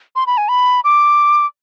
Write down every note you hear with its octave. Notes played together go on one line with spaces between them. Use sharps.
C6
B5
G#5
B5
D6